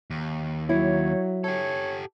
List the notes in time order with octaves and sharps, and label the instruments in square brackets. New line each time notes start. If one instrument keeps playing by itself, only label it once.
[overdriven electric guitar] D#2
[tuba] F#3 [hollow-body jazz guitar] E4 [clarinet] C#5
[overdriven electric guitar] G4 A4 [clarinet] C#5